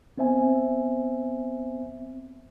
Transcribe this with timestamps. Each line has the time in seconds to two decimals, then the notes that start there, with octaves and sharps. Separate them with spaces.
0.18 B3 C4 C5 E5 G#5